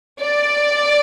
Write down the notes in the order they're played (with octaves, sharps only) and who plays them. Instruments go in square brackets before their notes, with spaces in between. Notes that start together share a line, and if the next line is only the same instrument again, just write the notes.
[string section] D5